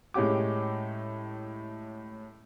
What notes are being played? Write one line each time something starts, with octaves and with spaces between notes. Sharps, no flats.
A2 G#3 C#4 G4 D6